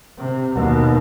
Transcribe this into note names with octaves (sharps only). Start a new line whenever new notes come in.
C3
D#2 B2